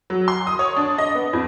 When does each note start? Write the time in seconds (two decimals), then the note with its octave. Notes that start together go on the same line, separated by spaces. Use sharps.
0.10 F#3
0.28 C6
0.47 D#6
0.59 C#5
0.77 D4
0.98 D#5
1.15 B3
1.33 F2